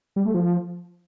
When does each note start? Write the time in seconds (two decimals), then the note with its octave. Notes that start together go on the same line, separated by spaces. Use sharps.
0.16 G3
0.25 A3
0.34 F3